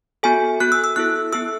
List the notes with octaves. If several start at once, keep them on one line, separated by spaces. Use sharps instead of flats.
B3 F#4 A4 G#5
B3 F#4 A4 F#6
E6
E6
B3 E4 A4 F#6
B3 E4 A4 E6